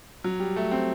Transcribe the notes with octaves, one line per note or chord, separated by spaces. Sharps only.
F#3
G3
A3
C4